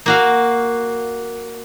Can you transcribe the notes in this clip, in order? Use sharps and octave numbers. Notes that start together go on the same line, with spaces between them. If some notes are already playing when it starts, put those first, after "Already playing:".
A#3 F#4 F5